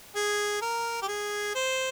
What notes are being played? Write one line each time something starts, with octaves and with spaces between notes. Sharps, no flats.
G#4
A#4
G4
G#4
C5